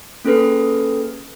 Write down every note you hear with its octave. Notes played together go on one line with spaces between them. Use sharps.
A#3 C#4 G#4 A4 B4